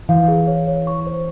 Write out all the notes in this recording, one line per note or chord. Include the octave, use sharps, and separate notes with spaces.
E3 F5
G#4
C#5
C#5
C#6
C5